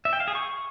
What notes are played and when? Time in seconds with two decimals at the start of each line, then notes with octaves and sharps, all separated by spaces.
0.05 E5
0.13 G5
0.20 F5
0.28 G#4
0.35 C#6